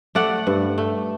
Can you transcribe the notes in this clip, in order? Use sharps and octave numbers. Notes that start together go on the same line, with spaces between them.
A3 D5 F#5
G2
A3